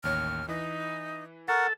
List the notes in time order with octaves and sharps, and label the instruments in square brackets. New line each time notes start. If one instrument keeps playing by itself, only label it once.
[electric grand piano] A1 D#2 C#5 [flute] F6
[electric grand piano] E3 B4 [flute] D#4
[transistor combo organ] A4 [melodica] A#4 F#5 [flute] C#6